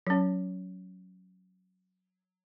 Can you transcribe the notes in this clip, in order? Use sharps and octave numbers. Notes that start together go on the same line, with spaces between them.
F#3 C#4